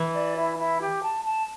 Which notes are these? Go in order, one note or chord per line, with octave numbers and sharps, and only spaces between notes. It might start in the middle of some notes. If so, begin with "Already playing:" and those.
Already playing: E3
D5
E4
E4
G4
A5
A5